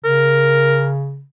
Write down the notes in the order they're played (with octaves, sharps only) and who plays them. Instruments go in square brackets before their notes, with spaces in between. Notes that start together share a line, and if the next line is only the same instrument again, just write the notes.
[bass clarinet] C#3 [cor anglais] A#4